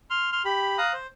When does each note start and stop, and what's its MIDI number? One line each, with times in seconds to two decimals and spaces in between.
0.10 0.30 84
0.10 0.30 89
0.32 0.42 84
0.32 0.42 89
0.45 0.77 67
0.45 0.77 83
0.78 0.93 77
0.78 0.93 82
0.78 0.93 87
0.78 0.93 90
0.93 1.07 72